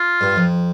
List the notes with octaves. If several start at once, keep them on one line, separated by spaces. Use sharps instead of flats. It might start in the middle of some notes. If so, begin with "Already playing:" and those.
Already playing: F4
G2
F2